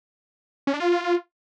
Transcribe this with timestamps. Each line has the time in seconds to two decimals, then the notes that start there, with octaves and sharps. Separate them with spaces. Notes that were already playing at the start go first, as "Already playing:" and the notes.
0.67 C#4
0.74 D4
0.80 F4